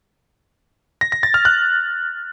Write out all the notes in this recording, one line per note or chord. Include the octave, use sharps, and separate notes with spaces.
A#6
A#6
A6
F6
F#6